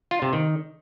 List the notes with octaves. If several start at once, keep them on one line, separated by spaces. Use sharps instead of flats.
F4
C3
D#3